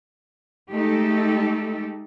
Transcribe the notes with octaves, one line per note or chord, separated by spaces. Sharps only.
G#3 A3 D#4 G4 A4